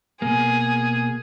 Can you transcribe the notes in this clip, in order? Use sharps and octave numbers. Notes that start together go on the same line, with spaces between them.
B2 A#3 G#4